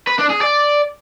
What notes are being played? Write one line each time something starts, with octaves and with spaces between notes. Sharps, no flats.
B4
D4
G#4
D5